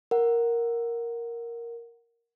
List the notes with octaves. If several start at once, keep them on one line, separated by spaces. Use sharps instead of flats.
A#4 F#5